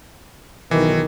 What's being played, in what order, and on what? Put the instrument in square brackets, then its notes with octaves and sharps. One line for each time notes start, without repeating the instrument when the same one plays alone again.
[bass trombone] B1 [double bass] D#3 [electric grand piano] E3